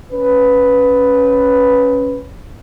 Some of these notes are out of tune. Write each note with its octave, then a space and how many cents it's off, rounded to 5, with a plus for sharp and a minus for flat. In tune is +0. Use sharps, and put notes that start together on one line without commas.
C#4 +0 B4 +0